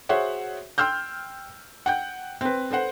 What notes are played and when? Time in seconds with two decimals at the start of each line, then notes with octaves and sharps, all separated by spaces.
0.09 F#4 G#4 C5 C#5 E5 F#5
0.78 G5 C6 E6 F6 G6
1.86 F#5 G5 G6
2.41 C4 B4
2.71 A4 B4 C5 F#5